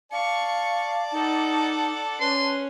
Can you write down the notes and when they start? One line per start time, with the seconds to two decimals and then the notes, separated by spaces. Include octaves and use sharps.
0.12 D5 F5 A5 C#6
1.12 D#4 A4 F#5
2.20 C#4 B4 C6